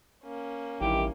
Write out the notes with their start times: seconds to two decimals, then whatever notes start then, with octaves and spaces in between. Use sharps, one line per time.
0.24 A#3 C#4
0.81 A1 G2 D#3 E4 G4